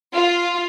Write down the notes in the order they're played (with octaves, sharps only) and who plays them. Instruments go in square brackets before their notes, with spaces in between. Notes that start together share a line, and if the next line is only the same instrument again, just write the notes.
[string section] F4